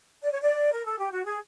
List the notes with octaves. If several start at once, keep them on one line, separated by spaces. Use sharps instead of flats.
D5
C#5
D5
A#4
A4
G4
F#4
G#4